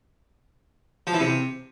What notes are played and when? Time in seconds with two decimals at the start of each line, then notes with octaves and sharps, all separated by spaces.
1.07 F3
1.14 E3
1.20 C3